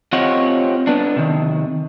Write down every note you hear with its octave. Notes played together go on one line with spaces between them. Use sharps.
C4 F4 G4 C#5 D#5 F#5
B3 D4
C3 D#3